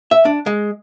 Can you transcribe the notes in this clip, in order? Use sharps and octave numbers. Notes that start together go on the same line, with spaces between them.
E5
D4
G#3